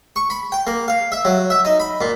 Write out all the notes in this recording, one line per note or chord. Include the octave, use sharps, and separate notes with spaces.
C#6
B5
G5
A#3
F5
E5
F#3
E5
D#4
B5
A#2